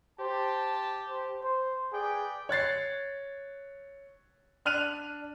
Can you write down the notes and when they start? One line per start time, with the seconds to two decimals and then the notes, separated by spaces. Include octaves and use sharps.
0.20 G4 C5 A5
1.09 C5
1.44 C5
1.93 G#4 B4 D5 G5
2.49 C#5 F#6 A6 C7
4.65 D4 F6 F#6 D#7 F7